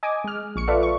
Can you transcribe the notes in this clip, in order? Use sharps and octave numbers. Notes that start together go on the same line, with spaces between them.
D#5 G#5 D6 D#6
G#3 F6
A#1 C#6 C#7
F4 A4 B4 D5 E5 F5
C#6